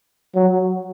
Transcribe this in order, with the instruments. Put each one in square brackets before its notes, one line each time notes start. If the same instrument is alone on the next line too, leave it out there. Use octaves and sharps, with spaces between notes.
[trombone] F#3